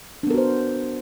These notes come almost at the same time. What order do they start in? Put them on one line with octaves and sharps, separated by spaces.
D4 B3 A#4 F#4 C5